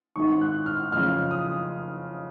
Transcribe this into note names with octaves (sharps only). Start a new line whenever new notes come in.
G#1 G#2 D#3 C#6
F#6
F6
F#1 F2 C#3 F6
D#6